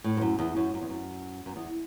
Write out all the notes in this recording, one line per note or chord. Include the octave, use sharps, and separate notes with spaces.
A2
G#2
F#2
E2
F#2
F#2
E2
F#2
F#2
E2